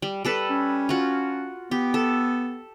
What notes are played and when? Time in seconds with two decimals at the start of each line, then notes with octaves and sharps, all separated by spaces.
0.02 G3
0.25 G3 A4 B4
0.50 C#4
0.89 F4 F#4
1.71 B3 G4
1.94 A4